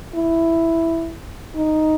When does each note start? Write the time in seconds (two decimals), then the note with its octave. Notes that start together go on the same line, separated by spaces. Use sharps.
0.15 E4
1.55 D#4